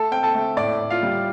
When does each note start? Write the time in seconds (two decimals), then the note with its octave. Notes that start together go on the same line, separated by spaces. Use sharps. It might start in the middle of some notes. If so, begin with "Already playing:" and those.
Already playing: A3 A4 A5
0.12 C4 G5
0.23 A4 A5
0.34 A3
0.57 A2 D5 D6
0.80 A2
0.90 F4 F5
1.03 G3